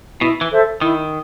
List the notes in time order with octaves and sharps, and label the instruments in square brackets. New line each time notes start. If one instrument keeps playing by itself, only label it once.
[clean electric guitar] B2 [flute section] E4
[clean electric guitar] E3
[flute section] A4 C5 E5
[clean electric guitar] D#3 [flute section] E4